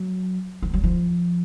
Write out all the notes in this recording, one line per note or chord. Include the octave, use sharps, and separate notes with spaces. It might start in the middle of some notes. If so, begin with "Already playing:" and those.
Already playing: F#3
F3
F#3
F3